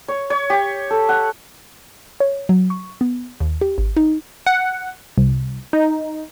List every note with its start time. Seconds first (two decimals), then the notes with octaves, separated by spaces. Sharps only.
0.08 C#5
0.30 C#5
0.50 G4
0.91 A4
1.09 F#5
2.20 C#5
2.49 F#3
2.70 C#6
3.01 B3
3.40 D#2
3.61 G4
3.78 G#1
3.96 D#4
4.47 F#5
5.18 C2
5.73 D#4